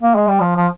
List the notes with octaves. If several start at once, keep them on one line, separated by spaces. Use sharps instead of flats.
A#3
G#3
G3
F3
F3